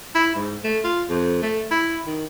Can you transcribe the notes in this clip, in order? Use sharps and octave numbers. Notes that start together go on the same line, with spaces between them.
E4
G#2
A3
F4
F2
A3
E4
D#3